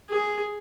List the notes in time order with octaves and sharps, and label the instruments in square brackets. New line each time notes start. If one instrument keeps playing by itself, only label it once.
[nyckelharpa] G#4